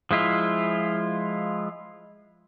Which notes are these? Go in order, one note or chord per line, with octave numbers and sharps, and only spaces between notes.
F3 G#3 E4 F4